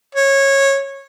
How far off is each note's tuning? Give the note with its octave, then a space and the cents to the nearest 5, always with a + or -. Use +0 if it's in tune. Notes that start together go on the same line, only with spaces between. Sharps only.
C#5 -15